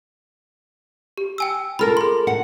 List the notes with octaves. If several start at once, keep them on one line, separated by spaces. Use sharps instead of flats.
G4
G5 G#5 E6
F4 A4 A#4 B5 F6
G#4 C6
F#5